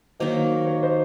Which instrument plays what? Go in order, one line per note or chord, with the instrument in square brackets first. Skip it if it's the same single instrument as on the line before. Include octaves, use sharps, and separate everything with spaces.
[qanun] D#3 F#3 A#3 [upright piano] C5 D#5
[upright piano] C#5
C5 D#5